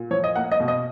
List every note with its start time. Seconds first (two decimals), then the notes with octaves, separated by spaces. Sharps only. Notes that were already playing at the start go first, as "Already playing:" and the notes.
Already playing: A#2
0.11 F3 C#5
0.24 D#5
0.36 A#3 F#5
0.52 D#5
0.60 B2
0.68 D#5